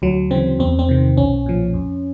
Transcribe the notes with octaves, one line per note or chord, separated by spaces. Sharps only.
D2 F#3
C#3 E3 C4
E2 C4
C4
C3 D#3
B1 C#4
A#2 F3
F2